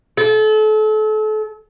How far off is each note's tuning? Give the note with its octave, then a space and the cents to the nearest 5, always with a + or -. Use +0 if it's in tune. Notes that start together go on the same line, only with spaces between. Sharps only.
A4 -35